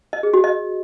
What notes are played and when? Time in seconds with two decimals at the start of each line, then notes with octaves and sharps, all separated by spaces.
0.13 D#5
0.23 G#4
0.34 F#4
0.44 D#5